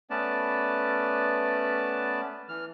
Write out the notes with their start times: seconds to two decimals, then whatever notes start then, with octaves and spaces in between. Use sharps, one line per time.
0.10 A3 B3 C#4 B4 D5 A5
2.49 E3 F6